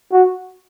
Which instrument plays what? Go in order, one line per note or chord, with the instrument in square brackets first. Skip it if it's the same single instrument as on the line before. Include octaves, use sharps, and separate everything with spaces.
[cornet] F#4